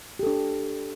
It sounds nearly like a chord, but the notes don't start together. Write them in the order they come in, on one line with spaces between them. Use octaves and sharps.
G4 A4 D4